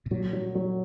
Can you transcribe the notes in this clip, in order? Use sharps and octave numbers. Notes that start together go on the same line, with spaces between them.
B2
A#2 F#3
F#3
F#3